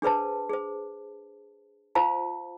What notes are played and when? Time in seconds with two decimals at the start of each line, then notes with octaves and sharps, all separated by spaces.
0.02 D4 G#4 B4 C5 A5
0.50 G#4 C5
1.95 F4 C5 F5 A5